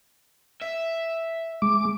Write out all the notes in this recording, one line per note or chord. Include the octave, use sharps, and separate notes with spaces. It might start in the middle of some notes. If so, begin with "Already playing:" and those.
E5
G#3 D6